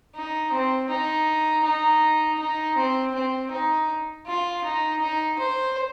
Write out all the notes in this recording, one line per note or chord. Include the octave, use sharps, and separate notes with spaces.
D#4
C4
D#4
D#4
D#4
C4
C4
D#4
F4
D#4
D#4
C5